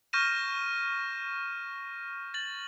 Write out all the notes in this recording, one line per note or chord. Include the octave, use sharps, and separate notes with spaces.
C#6 F6 G6 A#6 D#7 E7
A6 F#7